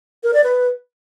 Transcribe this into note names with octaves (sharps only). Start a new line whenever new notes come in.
A#4
D5
B4